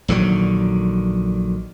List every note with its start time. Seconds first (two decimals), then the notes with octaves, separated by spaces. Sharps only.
0.08 A#1 D3 D#3 F#3